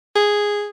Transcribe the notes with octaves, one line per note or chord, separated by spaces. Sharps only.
G#4